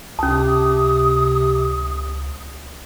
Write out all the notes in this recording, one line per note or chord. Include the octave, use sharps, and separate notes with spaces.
C#2 C3 C#4 A5 D#6